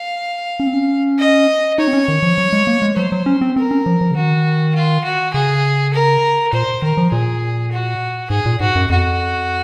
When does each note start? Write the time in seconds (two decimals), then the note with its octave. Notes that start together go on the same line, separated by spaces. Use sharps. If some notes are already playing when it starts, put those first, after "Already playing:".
Already playing: F5
0.60 C#4
0.67 C4
0.74 C#4
1.19 D#5
1.78 D#4 C#5
1.88 C4
1.93 C#4
2.08 D#3
2.23 F3
2.38 F#3
2.53 G#3
2.67 A#3
2.82 G#3
2.96 F#3 C5
3.12 F#3
3.26 C#4
3.41 C4
3.56 C4 A#4
3.71 C#4
3.86 F3
4.01 F3
4.11 C#3
4.15 D#3 F#4
4.74 F4
5.04 F#4
5.33 C#3 G#4
5.93 A#4
6.53 A#2 C5
6.82 D#3 A#4
6.97 F3
7.11 A#2 G#4
7.71 F#4
8.30 G#2 G#4
8.46 A#2
8.60 G#2 F#4
8.75 F#2
8.89 F2 F#4